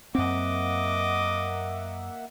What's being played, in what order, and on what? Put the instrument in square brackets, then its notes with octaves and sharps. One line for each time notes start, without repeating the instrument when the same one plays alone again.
[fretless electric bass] F#2 C4 [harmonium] A#3 E5 F#5 [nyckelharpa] D#5 D6